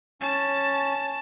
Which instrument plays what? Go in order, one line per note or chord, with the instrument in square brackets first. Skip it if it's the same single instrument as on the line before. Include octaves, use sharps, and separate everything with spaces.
[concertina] C#4 [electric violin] A5